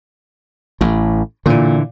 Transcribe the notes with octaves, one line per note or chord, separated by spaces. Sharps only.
A1 A2
A#2 D3 E3